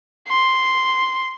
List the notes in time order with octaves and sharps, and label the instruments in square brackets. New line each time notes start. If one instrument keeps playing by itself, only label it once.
[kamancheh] C6